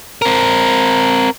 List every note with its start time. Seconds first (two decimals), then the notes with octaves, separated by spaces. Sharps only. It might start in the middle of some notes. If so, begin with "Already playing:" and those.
0.22 C4 A#4